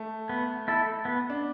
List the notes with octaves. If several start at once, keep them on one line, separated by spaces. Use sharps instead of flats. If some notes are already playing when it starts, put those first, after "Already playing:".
Already playing: A3
B3
E4 A4
B3
D4